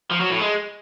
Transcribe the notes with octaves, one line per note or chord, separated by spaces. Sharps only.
F3
F#3
A2
G#3